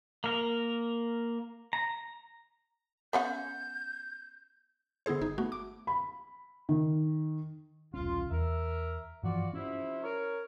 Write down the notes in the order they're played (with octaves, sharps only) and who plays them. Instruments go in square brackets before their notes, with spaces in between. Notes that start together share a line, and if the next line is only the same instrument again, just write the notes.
[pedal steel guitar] A#3 A#4
A#5
[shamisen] B3 C#4 F#5 [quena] G6
[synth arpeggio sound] D3 B3 E4 G#4 C5
G1 D#4 G#4
A3 B3 F#4
D6
[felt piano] B5
D#3
[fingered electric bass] E1 C2 C#4 [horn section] F4
[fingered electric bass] E2 [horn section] A#4 E5
[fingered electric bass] G2 E3 F3 [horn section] F4 F#4 D5
[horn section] C3 F3 E4 [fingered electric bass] C#4
[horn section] A#4 C#5